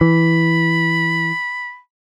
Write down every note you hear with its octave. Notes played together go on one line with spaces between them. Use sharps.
E3 B5